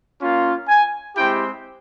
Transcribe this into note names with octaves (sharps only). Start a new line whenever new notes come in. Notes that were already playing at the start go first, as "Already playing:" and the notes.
A#3 C#4 F4
G#5
G#3 C4 E4 G4 G5